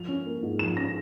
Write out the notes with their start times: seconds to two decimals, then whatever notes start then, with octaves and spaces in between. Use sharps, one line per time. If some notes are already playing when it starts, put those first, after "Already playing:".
Already playing: F3 F7
0.08 C#4
0.26 A#3
0.43 G#2
0.59 F3 E7
0.77 C#4 A#6